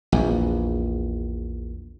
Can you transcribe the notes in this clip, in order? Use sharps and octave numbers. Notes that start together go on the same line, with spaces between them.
A#1 E2